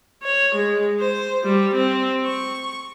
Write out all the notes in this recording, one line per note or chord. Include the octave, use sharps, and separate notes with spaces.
C#5
G#3
C5
G3
C4
C#6